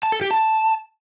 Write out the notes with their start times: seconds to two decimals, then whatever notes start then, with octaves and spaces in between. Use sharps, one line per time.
0.03 A5
0.12 A4
0.21 G4
0.31 A5